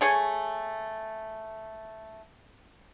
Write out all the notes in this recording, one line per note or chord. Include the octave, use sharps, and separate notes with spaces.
A3 G#4 C#5 G#5